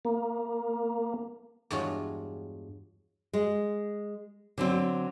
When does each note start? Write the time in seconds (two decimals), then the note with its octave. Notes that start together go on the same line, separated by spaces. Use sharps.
0.05 A#3
1.70 E2 G2 G#3 F4 F#4 C#5
3.33 G#3
4.58 D3 F#3 C4